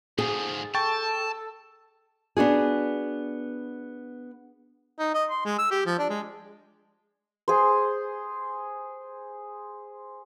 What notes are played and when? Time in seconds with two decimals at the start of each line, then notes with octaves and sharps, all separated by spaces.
0.18 G#2 F3 G#4
0.75 A4 G5 A5 C#6 A6
2.37 B3 D4 F#4 G#4
4.99 D#4
5.14 D#5
5.30 C6
5.45 G#3
5.58 E6
5.71 G4
5.86 F3
5.98 D4
6.09 G#3
7.48 G#4 C5